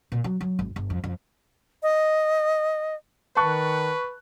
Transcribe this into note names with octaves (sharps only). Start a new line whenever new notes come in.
A#2
F#3
F#3
G#1
G1
F2
F2
D#5
D#3 B4 A5 C#6 F#6